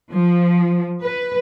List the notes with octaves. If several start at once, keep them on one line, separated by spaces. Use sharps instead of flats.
F3
B4